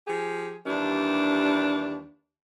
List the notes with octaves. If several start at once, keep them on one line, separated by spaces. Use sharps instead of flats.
F3 G4 G#4
D#2 E3 G3 D4